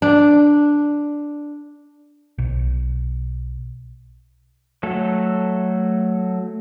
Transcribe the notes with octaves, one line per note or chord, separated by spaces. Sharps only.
D4
B1
F#3 A3 A4